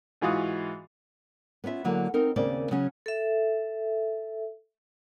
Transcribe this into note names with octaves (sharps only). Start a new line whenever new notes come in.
G#2 E3 F4 F#4 D#6
B3 C#4 F4 E5
D3 F#3 A#3 E4
C4 D#4 A#4
D#2 C#3 A#3 C4 D5
C#3 F#3 C#4
A4 E5